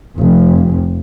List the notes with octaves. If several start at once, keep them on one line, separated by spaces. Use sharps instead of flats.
F1 F2